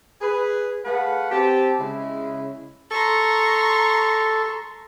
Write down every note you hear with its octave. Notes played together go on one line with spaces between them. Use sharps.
G#4 B4
A3 G#4 B4 F5 F#5
C4 G4 A5
C#3 G#3 E4
A4 A#5 C6 C#6